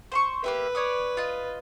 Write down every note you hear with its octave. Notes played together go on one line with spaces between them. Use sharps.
C5 C6 C#6
A#3 G4 B4 E5
C#5 D5 D#6
F4 D#5